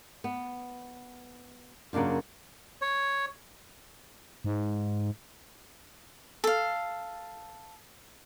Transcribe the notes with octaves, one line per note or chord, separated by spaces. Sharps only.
B3
F#2 C#3 A#3 D4 F4
C#5
G#2
A4 F5